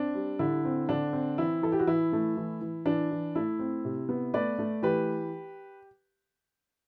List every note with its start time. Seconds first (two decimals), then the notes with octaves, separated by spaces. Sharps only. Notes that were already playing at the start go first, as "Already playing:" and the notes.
Already playing: C4 D4
0.15 G3
0.39 D3 E4
0.65 C4
0.89 D3 D4
1.13 C4
1.38 E3 E4
1.62 E3 A4
1.72 G4
1.79 F#4
1.87 E3 E4
2.13 A3
2.37 E3
2.61 E3
2.86 E3 D4
3.11 E3
3.35 A3 E4
3.59 C4
3.85 C3
4.09 B3
4.34 A3 B4 D5
4.59 A3
4.83 E3 G4 B4